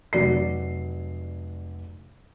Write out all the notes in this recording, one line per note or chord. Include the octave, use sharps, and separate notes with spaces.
F1 F#3 D5 C7